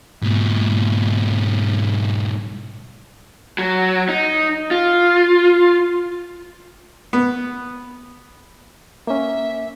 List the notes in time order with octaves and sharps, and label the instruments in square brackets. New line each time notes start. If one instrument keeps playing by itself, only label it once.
[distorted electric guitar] G#2 B2
[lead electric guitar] F#3
D#4
F4
[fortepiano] B3
[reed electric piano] A#3 C#4 [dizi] E5